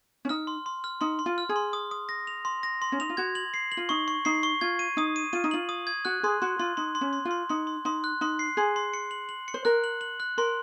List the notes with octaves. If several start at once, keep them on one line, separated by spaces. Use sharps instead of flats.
C#4
D#4 F6
C6
C6
F6
D#4 C6
C6
F4
F6
G#4
C6
D#6
D#6
A#6
F7
C6
A#6
C6
C#4
D#4 F7
F4
F#4 G#6
F#7
C7
F#7
F4
D#4 C#6
C#6
D#4 C7
C#6
F4 G#6
D#7
D#4 D#6
D#7
F4 D#7
D#4
F4 F#7
D#6
G#6
F#4 F#6
G#4 C6
F#4 C6
F4 C6
D#4 C6
C6
C#4
C6
F4
C6
D#4 C6
C6
D#4 C6
F#6
D#4 C6
C7
G#4 C6
C6
C#7
F#7
F#7
C#7
C5
A#4 F#6
F#7
F#7
F#6
A#4 C6